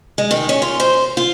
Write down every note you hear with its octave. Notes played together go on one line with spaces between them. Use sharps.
G#3
D#3
C#4
F4
C5
F4